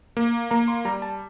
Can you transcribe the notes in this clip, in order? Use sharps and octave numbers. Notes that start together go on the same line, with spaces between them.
A#3
A#3 A#5
C6
G3 A#5
A5